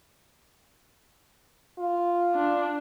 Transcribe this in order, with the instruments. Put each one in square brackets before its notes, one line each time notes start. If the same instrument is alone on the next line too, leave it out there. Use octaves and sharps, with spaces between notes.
[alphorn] F4
[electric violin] D4